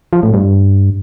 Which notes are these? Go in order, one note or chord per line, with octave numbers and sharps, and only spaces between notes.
F3
A2
G2